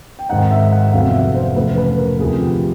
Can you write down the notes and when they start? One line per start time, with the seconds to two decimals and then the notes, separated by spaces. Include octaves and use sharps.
0.19 G5
0.29 G#2 D#3 G#3 C4 D#4 F#5
0.51 E5
0.72 F#5
0.92 F1 F2 D3 F#3 B3 F5
1.14 E5
1.35 C5
1.56 F1 F2 C#3 E3 A3 B4
1.78 B4
1.98 A#4
2.19 D2 C3 F3 G#4
2.41 G4